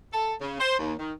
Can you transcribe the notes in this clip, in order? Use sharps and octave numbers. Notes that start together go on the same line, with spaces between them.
A4
C#3
C5
D#2
D#3